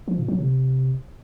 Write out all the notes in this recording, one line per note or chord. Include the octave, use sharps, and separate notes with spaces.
F3
A#2
F#3
C3